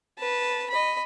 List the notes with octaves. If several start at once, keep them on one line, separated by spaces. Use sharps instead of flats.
B4 A5
D#5 B5